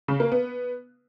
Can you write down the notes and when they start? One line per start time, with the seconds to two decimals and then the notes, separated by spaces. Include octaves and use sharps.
0.08 C#3
0.20 A#3
0.32 B3